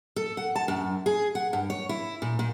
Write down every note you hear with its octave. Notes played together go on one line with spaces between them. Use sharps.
A4
F#5
A5
F#2
G#4
F#5
G2
C#5
E4
A#2
A#2